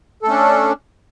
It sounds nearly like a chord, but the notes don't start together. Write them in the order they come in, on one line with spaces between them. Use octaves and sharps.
A4 A3 C#4 D4